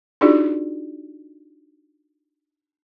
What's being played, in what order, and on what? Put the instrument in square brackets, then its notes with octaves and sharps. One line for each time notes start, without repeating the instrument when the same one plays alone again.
[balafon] D4 D#4 F4 F#4 G#4 D5